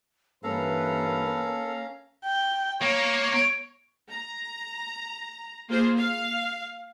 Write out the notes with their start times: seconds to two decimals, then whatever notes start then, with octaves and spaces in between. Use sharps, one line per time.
0.43 G2 E3 A#3 C#4 A4 B4 F5 A#5
2.25 G5
2.82 A#3 C#5
4.10 A#5
5.68 A#3 F4 G#4 C5
5.97 F5